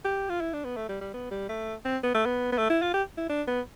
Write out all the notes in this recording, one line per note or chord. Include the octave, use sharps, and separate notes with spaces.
G4
F4
E4
D4
B3
A3
G3
G3
B3
G3
A3
C4
B3
A3
B3
B3
A3
E4
F4
G4
E4
D4
B3